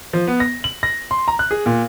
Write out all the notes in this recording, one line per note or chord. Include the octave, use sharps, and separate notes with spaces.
F3
B3
A#6
F#7
A#6
C6
A#5
F#6
G#4
A#2